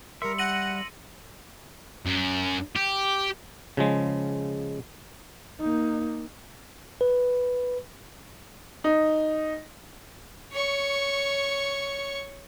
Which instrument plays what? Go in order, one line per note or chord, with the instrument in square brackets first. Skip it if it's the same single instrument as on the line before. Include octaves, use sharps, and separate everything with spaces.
[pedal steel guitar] G3 E5 [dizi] A#4 [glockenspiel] C6 E6 C#7
[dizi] F#5 [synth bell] A#6 D#7 F#7
[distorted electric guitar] F#2
G4
[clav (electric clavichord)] C#3 F3 G#3
[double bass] A#3 D#4
[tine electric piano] B4
[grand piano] D#4
[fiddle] C#5 C#6